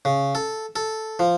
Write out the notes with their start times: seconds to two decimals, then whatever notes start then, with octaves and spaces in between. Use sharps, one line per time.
0.05 C#3
0.35 A4
0.76 A4
1.19 F3